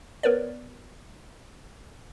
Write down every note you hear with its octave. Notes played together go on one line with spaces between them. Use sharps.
B3 A#4 B4 C#5 D5